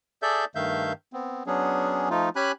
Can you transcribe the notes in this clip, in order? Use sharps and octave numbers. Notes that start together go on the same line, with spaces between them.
G#4 A4 D5 E5 G6
G2 D#3 A3 E5 F5 G6
B3 C4
F#3 B3 C#4 D4 G#4
F3 A3 D#4 F4
C#4 G4 G#5 B5 F#6